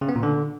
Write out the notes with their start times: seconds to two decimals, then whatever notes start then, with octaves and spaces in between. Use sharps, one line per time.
0.01 C#3
0.09 B3
0.16 A#2
0.23 D3